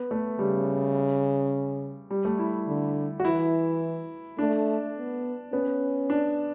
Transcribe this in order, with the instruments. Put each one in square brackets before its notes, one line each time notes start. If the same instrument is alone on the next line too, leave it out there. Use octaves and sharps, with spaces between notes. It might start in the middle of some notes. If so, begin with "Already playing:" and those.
Already playing: [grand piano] B3
A3
[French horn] C#3 [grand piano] G3
[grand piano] G3
A3
E4
[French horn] D3
[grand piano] F#4
[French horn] E3 [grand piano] E4
[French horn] A3 [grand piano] D4
[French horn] B3
[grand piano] B3 [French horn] C#4
[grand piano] D4